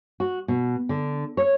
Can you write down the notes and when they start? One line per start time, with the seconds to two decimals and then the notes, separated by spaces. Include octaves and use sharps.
0.20 F#4
0.48 B2
0.89 D3
1.37 C#5